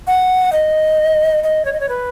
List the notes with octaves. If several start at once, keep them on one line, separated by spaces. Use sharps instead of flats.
F#5
D#5
D#5
C#5
D#5
C#5
B4